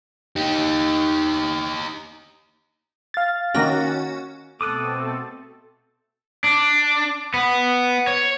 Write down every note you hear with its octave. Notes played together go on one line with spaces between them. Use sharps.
D#4 G4
F5 A6
D#3 A#3 C#4 F#4 A#6
B2 A3 C4 A4 D6 D#6 F#6
D4
B3
C#5